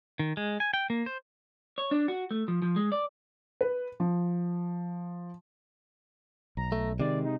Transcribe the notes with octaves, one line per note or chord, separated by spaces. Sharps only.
D#3
G#3
G#5
G5
A#3
C5
C#5
D4
F#4
A3
F3
F3
G#3
D5
B4
F3
B1 A#5
A3
C3 D#3 G#3 D5
D#4